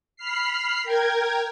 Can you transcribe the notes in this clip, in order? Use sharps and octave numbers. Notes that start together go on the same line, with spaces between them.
B5 F6 C7
A#4 G5 G#6